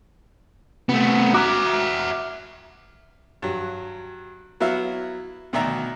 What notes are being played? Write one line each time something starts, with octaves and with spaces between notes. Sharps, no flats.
C3 A3 B3
F#4 E5 A#5 D6 F#6
G2 F#3
F#3 B3 E4 F#4 E5 F5
D2 B2 D#3 D5 E5 A#5